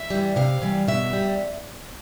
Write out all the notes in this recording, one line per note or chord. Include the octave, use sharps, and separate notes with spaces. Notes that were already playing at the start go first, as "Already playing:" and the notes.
Already playing: E5
E3 G3
C3 F5
E3 G3
B2 E5
G3